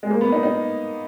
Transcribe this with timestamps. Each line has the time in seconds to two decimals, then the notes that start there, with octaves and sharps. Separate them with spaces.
0.03 G#3
0.11 A#3
0.21 B3
0.32 D#4
0.43 D#4